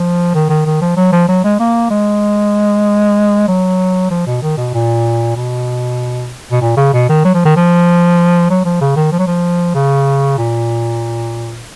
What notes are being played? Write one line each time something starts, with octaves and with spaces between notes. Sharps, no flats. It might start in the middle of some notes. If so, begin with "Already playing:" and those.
Already playing: F3
D#3
D#3
D#3
F3
F#3
F3
F#3
G#3
A#3
G#3
F#3
F3
B2
D#3
B2
A#2
B2
B2
A#2
C#3
B2
D#3
F#3
F3
D#3
F3
F#3
F3
C#3
D#3
F3
F#3
F3
C#3
A#2